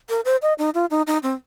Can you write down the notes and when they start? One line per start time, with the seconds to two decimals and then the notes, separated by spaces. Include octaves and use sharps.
0.09 A#4
0.25 C5
0.42 D#5
0.58 D#4
0.74 F4
0.91 D#4
1.07 D#4
1.23 C4